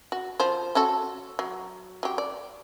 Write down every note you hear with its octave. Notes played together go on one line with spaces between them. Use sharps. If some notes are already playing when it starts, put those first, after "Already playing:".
F#4
F3 C5
C#4 F#4 A4
F#3
F#3 G4
D5